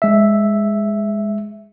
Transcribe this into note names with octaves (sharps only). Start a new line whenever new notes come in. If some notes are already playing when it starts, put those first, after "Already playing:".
G#3 E5